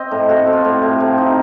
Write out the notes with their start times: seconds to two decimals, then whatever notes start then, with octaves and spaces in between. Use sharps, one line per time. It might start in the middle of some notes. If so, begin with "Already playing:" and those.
Already playing: C4 D#5
0.11 A2
0.29 A2 F#4
0.47 C4
0.53 F4
0.65 A2
0.82 A2
1.00 C3 F4
1.18 D#4